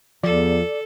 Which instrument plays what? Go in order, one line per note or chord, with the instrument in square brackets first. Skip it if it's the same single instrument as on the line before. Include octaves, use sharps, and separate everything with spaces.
[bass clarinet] E2 [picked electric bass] F3 [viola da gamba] A4 [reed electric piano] D5